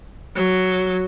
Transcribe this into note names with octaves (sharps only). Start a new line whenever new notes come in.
F#3